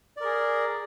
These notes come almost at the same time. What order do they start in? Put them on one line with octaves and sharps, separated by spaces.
D5 A#4 G#4